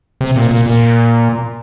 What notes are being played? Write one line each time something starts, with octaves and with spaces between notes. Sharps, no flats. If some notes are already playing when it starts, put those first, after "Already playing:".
C3
A#2
A#2
A#2